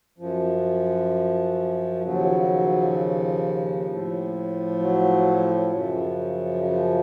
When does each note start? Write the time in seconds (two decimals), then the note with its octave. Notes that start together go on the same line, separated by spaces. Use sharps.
0.18 F#2 F3
2.03 D#2 C#3 F3 F#3
3.87 A2 F3
4.79 F#3
5.71 F#2 C#3 F3
6.63 F3